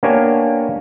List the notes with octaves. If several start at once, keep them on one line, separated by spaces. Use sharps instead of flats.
A#3 B3 D4 G4 C#5 G#5